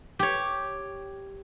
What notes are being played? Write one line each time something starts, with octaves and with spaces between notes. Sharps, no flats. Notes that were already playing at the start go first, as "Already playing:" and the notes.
G4 C#5